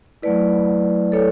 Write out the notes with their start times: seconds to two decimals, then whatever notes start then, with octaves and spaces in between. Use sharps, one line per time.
0.22 F#3 A3 E4 B4 D5
1.12 A4 C#5